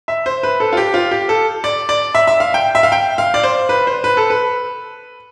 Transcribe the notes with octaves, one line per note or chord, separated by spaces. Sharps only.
E5
C5
B4
A4
F4
G4
F4
G4
A4
D5
D5
E5
E5
F5
G5
E5
F5
G5
F5
D5
C5
B4
C5
B4
A4
B4